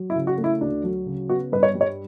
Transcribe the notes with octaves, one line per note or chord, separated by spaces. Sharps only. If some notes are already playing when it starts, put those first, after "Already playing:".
Already playing: F#3
E4
C#3
F#4
A3
E4
D2 D4
F#3
C#3
B3 F#4
G2 B4
C#5
G3
C#5